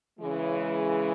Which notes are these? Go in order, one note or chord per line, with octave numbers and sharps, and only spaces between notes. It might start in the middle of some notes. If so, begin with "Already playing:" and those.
C#3 E3 G#3